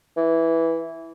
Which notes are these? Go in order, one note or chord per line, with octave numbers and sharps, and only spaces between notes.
E3